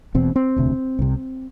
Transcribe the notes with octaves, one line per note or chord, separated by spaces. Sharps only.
E1 E2 B2 C4
C4
E1 D2 C3
C2 C3